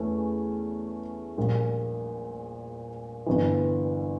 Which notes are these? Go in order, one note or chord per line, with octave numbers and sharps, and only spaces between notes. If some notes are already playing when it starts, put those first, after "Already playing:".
Already playing: E2 E3 A3 C#4
A#1 A#2 G3
G1 G2 E3